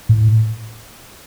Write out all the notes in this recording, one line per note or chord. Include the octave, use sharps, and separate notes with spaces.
A2